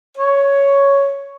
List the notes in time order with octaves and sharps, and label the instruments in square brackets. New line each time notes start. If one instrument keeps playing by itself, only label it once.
[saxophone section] C#5